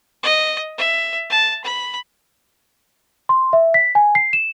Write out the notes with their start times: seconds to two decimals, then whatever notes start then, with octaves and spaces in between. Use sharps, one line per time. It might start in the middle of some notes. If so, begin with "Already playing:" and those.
0.23 D#5
0.78 E5
1.30 A5
1.64 B5
3.29 C6
3.53 E5
3.74 B6
3.95 G#5
4.15 C7
4.33 E7